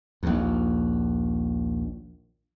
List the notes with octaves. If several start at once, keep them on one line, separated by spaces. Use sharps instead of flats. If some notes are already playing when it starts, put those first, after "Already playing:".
A#1 D#2